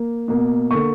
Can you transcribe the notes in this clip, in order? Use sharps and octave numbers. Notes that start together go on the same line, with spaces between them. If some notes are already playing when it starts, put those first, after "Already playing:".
Already playing: A#3
B2 A#3
D3 A#3 C#6